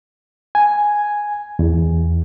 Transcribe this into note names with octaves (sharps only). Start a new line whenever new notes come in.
G#5
E2